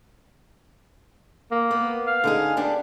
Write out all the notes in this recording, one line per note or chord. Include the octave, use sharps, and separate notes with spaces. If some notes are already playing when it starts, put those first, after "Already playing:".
A#3
B3
F5
D3 D#4 G#4
B3 D4 G4